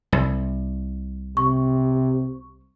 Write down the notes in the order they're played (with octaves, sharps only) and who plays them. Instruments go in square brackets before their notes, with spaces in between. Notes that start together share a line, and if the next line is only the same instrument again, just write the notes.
[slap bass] C2
[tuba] C3 [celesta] C#6